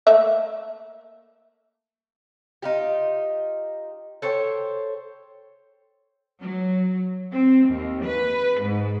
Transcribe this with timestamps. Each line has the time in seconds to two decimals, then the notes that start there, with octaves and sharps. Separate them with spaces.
0.07 A3 A#3 E5
2.62 D#4 F4 G4
4.22 A4 C5 C#5 G5
6.41 F#3
7.32 C4
7.68 D#2
8.04 B4
8.61 G#2